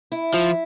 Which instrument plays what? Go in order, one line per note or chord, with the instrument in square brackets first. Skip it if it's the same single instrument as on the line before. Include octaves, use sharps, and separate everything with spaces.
[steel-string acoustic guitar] E4
[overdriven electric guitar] F3